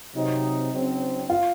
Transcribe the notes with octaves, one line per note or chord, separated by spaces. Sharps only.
C3 F#3 C4 D#4
C#3 F#3 C4 D#4
F4